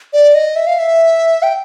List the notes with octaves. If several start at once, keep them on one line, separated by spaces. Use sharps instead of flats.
D5
D#5
E5
F5
E5
G5